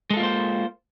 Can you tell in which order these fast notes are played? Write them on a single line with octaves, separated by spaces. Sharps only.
G#3 A4 F4 A#3 C5